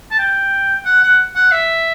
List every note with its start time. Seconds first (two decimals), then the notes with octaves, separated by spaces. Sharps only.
0.11 A5
0.19 G5
0.85 F#5
1.03 F#5
1.35 F#5
1.52 E5